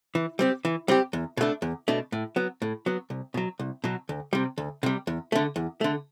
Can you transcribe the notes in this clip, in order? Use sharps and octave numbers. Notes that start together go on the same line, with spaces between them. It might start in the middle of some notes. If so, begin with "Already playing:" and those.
E3
G3 C4 G4
E3
G3 C4 G4
E2
B2 A3 D4
E2
B2 A3 D4
A2
F#3 B3
A2
F#3 B3
C2
B2 F#3
C2
B2 F#3
D2
C3 G3
D2
C3 G3
E2
D3 A3
E2
D3 A3